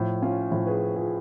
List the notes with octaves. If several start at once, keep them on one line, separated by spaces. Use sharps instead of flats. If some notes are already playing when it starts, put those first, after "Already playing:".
Already playing: A2 F3
C#4 F4
A2 F3
G#4 B4
F4 G#4